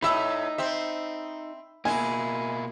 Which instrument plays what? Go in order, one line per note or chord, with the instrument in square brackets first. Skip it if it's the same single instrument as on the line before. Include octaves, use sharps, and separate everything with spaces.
[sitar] A2 E5 [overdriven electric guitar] D#4 [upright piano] B5 E6
[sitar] C4 E5
[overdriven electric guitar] B2 A#3 [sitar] G#3 E4 [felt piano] G#5